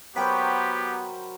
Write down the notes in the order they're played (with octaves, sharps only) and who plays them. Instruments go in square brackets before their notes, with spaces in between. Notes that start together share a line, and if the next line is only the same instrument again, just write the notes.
[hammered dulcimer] F#3 A#4 C5 [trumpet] B3 [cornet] G4 [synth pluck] G5 B5